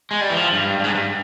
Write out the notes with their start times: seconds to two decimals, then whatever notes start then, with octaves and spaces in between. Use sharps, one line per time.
0.11 G#3
0.21 G3
0.30 E3
0.36 F3
0.53 G2
0.79 G2
0.84 G#2
0.95 G2